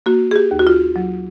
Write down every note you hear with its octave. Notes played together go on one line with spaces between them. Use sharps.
A#3 F#4
G#4
G4
D#2
F#4
F4
F#3